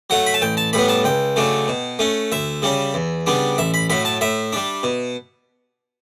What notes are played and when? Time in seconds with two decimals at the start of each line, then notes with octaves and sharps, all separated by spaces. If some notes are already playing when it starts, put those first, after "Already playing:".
0.10 F#3 A3 F#5
0.26 B5
0.34 A5
0.42 A1 G5
0.57 A5
0.73 A2 G3 B3 B5
0.89 A5
1.04 C#2 G5
1.36 C#3 F#3 A3 D4
1.68 B2
1.99 A3 C#4
2.32 D2 E5
2.62 C#3 G3 C#4
2.94 E2
3.26 C#3 G3 B3 D4
3.58 A1 E5
3.74 B5
3.90 A2 F#3 B5
4.05 A5
4.21 A2 E5
4.53 G3 D4
4.83 B2